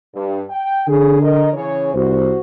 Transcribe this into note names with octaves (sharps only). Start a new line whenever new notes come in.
G2
G5
D3 G#4
A#4 D#5
C#3 E3 C#5
C2 F#4 C5